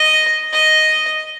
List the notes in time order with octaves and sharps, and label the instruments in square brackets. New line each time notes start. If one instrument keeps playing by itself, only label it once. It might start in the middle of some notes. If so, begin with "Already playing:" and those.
Already playing: [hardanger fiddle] D#5
D#5